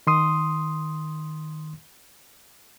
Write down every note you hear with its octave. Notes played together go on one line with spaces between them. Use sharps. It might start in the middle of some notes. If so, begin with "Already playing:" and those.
D#3 C6 D#6